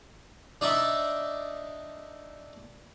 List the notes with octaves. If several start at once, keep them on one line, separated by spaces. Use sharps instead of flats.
D4 D#4 D5 E5 B5